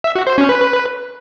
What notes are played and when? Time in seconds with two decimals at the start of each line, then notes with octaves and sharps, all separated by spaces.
0.04 E5
0.15 F#4
0.27 C5
0.38 C#4
0.49 B4